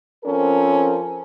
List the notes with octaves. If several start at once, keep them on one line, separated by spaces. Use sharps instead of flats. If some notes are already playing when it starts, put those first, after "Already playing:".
F3 C4 C#4 A4 A#4